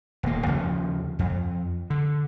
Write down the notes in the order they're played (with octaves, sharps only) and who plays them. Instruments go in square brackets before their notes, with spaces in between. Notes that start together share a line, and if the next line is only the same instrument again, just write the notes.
[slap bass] D#1 A#3
D#2 C#3 F3
F2
D3